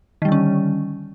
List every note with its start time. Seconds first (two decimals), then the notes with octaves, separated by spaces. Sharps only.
0.22 D#3
0.25 G3
0.28 D3
0.32 C#4